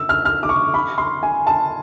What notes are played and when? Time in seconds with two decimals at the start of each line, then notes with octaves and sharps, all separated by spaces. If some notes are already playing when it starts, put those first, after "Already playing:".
Already playing: E6
0.09 F6
0.25 F6
0.43 D6
0.49 C#6
0.74 B5
0.98 C6
1.23 G#5
1.47 A5